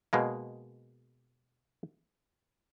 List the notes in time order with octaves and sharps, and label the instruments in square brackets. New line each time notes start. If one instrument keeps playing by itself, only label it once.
[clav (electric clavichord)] B2 G#3 A#3